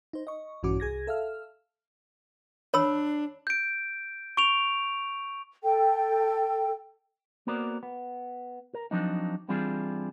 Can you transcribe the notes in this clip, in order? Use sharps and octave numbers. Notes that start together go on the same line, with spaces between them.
D#4 C5
D#5 C#6
A#1 G2 E3 C#4 F#4 D6
C2 G#4 G#6 A#6
A4 E5 F5 F6
D4 C#5 B5 E6
G6 D7
C#6 D7 F7
A4 G5
A#3 B3 F#4 A#4 C5 D5
B3
A#4
F3 F#3 C4 D4 D#4
E3 G3 C4 D4 F4 G#4